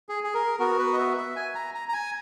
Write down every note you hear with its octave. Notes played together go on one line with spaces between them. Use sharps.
G#4
G#4
A#4
B3 F#4 A#4
B4
D#5
E5
E5
G#5
A#5
A#5
A#5
G#5